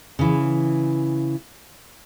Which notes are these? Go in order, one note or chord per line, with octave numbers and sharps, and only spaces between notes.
C#3 E3